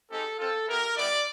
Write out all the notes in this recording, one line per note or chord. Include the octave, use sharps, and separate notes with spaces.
G#3 C4 D#4 G4 A4
C4 F4 A4
B3 E4 G4 A#4
G3 B3 E4 D5